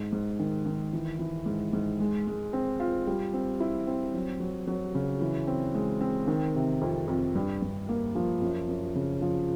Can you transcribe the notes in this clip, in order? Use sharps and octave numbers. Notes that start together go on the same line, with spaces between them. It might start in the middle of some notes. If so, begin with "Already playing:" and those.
Already playing: G#2
G#2
D#3
D#3
E3
E3
G#2
G#2
G#3
G#3
C4
F4
G3
C4
E4
C4
F#3
F#3
F#3
C#3
E3
C4
G#3
C4
D#3
C3
F2
F2
G2
G2
A#3
F3
F#2
F#2
C#3
F3